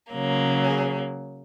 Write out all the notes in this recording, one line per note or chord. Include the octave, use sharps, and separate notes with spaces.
C#3 F#3 A#3
G#4